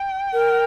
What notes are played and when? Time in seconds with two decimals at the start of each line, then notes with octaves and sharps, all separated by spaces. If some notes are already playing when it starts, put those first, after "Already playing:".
Already playing: G5
0.33 A#4